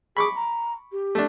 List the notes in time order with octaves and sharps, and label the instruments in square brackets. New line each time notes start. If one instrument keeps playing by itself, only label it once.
[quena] G#4 [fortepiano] B5 C#6 D6
[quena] A#5
G4
[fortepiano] A3 D4